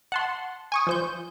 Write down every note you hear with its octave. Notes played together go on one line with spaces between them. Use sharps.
F#5 A5 C6
G#5 C#6 D#6
F3 C5 G6